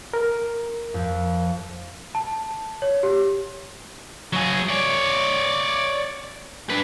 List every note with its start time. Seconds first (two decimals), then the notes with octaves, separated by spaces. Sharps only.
0.13 A#4
0.94 F2
2.15 A5
2.82 C#5
3.03 G4
4.33 F#3 G#4
4.69 C#5 D5
6.69 D4 B4